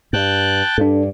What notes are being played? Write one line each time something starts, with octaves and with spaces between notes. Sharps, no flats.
G2 G5 A5 F#6
G2 D4 A4